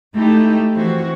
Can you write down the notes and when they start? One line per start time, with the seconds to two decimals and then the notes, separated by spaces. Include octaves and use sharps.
0.16 A3 D#4 E4 G4
0.73 E3 F3 C4 F#4